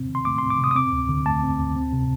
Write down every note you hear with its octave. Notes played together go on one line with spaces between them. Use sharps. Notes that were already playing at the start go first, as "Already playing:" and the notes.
Already playing: D#2 C3 C4
D#3
C6
A3 D6
C6
C4
D6
C3 D#6
D#6
C4 D6
D2
D3
A3 A5
C4
D2
C4
C3